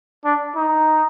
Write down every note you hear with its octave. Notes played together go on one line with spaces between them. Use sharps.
D4
D#4